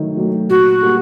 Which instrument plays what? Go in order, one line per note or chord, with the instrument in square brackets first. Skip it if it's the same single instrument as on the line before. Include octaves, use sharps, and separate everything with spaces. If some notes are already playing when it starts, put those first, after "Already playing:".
Already playing: [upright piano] D#3 F#3 A3
F#3 A3
[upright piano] A#2 [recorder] F#4
[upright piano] G3 A#3